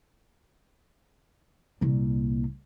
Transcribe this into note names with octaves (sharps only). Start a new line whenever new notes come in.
C2 A#2